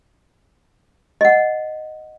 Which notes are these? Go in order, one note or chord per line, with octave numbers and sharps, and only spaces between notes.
D#5 F#5